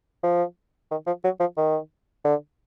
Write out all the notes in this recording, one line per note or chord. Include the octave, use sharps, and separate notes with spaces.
F3
D#3
F3
F#3
F3
D#3
D3